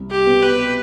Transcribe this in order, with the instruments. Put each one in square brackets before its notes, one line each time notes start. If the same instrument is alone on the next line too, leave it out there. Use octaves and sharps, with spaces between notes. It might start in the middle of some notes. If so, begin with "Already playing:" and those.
Already playing: [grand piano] C2
[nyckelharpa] G4
[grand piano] B2 B3
[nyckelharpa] B4